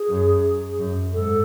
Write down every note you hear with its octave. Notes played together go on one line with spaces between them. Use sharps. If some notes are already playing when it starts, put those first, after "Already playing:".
Already playing: G#4
F#2
F#2
G#2 A4